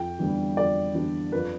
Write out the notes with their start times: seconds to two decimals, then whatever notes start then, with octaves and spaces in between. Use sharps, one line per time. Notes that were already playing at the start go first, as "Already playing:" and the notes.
Already playing: F2 G5
0.19 E3 G3 B3 D4
0.57 F2 D5
0.94 E3 G3 B3 D4
1.32 F2 B4